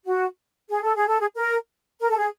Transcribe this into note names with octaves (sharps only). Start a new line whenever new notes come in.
F#4
G#4
A4
G#4
A4
G#4
A#4
A#4
A4
G#4